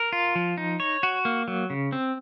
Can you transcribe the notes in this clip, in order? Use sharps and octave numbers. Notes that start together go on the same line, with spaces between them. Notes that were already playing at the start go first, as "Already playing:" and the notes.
Already playing: A#4
F4
F3
D#4
C#5
F#4
A#3
F#3
C#3
C4